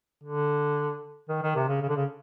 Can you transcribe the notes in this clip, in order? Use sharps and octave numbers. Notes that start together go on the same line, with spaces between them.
D3
D#3
D#3
C3
C#3
C#3
D3
C#3